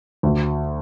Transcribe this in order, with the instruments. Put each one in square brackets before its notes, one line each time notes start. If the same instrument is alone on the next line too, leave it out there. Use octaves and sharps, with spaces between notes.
[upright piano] D2